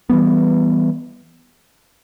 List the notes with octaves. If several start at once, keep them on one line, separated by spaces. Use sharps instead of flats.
E3 G3 B3